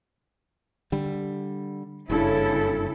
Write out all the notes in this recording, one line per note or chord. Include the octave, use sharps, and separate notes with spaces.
D3 G3
F#1 G2 C#3 D4 E4 A4